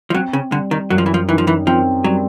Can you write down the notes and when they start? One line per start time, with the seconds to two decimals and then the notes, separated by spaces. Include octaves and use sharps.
0.10 F3
0.14 F#3 C4
0.33 C#3
0.52 D3 G3
0.71 D#3
0.90 F#2 F#3
0.98 F3
1.06 E3
1.14 F3
1.29 D#3 E3
1.38 F3
1.47 E3
1.67 F3 C4
2.04 F#3 G3